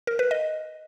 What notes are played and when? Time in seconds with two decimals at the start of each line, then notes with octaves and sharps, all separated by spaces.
0.07 A#4
0.19 B4
0.31 D#5